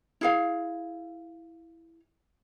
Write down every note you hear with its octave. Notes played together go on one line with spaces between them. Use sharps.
E4 G#4 F5